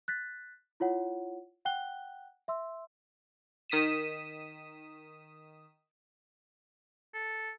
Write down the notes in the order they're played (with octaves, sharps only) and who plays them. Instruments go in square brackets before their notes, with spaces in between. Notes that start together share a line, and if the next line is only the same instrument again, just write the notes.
[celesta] F#6 A6 B6
E4 F4 C#5 F#5
F#5 G5 F#6 G7
E5 C6 E6
[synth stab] D#3 D#6 B6 D#7 E7
[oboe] A4